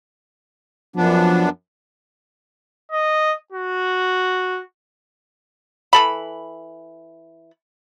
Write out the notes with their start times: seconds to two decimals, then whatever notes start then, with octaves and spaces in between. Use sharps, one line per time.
0.96 F#2 F3 B3 D4
2.92 D#5
3.52 F#4
5.93 E3 A4 B5